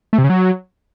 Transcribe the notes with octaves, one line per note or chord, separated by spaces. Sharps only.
A3
C3
C#3
F#3